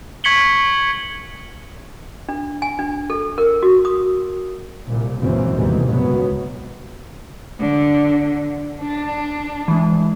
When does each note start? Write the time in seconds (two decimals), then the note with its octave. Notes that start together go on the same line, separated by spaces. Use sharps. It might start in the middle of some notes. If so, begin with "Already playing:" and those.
0.24 C#6 G#6 B6 C#7 F#7 G7
2.29 D4
2.62 G#5
2.79 D4
3.10 A4
3.38 A#4
3.63 F#4
3.85 D#6
4.88 C2 A#2
5.21 F#1 C#2 F#2 A#2 E3 C4
5.55 F1 D#2 G#2 B2 E3 G3
5.88 C#2 F#2 F#3 B3
7.59 D3
8.81 D4
9.68 E3 G#3